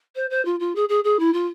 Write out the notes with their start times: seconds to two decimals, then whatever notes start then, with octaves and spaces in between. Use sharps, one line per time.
0.15 C5
0.30 C5
0.45 F4
0.60 F4
0.75 G#4
0.89 G#4
1.04 G#4
1.19 E4
1.33 F4